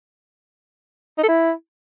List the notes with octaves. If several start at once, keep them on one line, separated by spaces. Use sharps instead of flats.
D#4
A4
E4